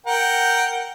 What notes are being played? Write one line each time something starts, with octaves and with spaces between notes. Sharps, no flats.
A#4 F#5 G5